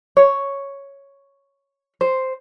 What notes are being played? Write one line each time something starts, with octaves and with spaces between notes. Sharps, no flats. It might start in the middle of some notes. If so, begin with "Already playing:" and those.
C#5
C5